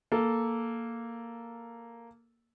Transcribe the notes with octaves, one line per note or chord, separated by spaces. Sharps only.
A#3 A4